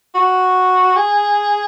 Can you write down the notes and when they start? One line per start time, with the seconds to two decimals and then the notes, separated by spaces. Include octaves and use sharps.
0.15 F#4
0.96 G#4